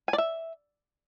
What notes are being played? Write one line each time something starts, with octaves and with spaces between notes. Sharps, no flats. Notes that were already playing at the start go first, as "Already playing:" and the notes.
G#5
D5
E5